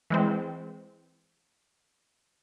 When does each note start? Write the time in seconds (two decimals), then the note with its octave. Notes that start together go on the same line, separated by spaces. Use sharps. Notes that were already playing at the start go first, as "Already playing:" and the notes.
0.10 E3 G#3 C4